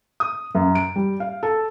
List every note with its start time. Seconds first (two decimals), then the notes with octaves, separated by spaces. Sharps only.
0.20 D#6
0.55 F#2
0.75 D7
0.96 G3
1.20 F5
1.43 A4